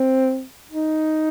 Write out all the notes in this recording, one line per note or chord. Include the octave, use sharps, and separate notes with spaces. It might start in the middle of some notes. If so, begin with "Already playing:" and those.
Already playing: C4
D#4